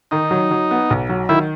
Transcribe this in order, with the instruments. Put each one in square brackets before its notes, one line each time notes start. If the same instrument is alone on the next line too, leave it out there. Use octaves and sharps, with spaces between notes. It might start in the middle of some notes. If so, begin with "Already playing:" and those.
[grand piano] D#3 [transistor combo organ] D#4
[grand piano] F#3
F#3
B3
B1
F#3
[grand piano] D#3 [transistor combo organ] E4